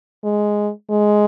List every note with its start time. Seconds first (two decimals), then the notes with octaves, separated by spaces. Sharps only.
0.24 G#3
0.91 G#3